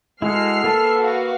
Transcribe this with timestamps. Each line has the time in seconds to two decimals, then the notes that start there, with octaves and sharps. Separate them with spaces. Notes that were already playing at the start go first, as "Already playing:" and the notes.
0.22 G#3 E4 F#4 A4 F6 C7
0.64 A#3 A4 B4 E5
0.98 F#4 F5